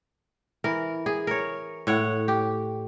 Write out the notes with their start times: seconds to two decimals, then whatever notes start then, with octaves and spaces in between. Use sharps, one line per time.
0.64 E3 A#4
1.06 G#4
1.27 A#4 C#5
1.87 A2 C#5 F#5
2.28 G4